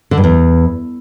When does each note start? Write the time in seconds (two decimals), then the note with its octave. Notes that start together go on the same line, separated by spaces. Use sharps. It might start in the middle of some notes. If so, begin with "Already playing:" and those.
0.11 D3
0.17 G2
0.24 E2